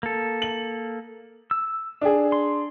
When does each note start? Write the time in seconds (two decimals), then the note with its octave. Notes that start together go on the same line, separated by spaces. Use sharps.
0.03 A#3 A4
0.42 F#7
1.51 E6
2.01 D4 G#4
2.32 C6